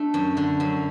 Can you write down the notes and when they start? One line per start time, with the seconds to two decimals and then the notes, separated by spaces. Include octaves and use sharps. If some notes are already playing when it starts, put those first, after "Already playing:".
Already playing: A3 D4
0.14 F#2
0.37 D3
0.60 F#2